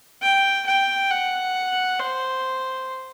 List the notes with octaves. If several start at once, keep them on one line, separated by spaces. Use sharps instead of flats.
G5
G5
F#5
C5